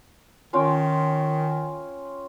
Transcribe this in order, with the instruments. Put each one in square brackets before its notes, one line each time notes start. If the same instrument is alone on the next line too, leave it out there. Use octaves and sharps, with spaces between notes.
[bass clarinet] D#3 [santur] C#4 F4 G5